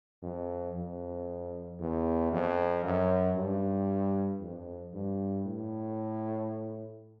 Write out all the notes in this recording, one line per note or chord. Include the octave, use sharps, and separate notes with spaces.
F2
F2
E2
F2
F#2
G2
F2
G2
A2